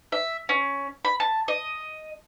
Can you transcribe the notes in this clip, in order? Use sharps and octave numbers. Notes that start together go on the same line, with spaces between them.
E5
C#4
B5
A5
D#5